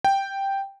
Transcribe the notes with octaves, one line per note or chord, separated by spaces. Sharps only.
G5